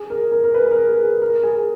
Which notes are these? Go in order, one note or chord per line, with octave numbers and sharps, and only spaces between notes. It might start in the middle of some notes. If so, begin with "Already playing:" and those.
Already playing: G#4
A#4
A#4
A#4
B4
A#4
G#4
A#4
A#4
G#4